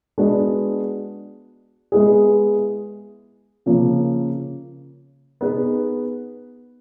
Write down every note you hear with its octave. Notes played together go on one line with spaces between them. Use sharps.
G#3 B3 D4 F#4
G#3 B3 E4 G#4
C#3 F3 A#3 C#4
B3 D#4 G#4 B4